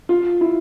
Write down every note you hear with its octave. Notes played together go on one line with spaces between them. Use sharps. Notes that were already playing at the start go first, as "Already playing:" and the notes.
F4
E4